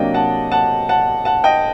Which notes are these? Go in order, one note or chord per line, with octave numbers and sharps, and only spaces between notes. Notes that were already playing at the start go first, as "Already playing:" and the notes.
Already playing: C3 F#3 A#3 D4 D#5 G5
F#5 A5
F#5 A5
F#5 A5
F#5 A5
D#5 G5